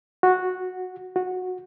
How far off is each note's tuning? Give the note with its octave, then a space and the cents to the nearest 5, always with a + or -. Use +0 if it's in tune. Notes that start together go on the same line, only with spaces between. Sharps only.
F#4 -10
F#4 -15